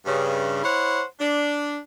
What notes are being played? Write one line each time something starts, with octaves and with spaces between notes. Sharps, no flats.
G2 C#3
E4 C5 C#5 F#5
D4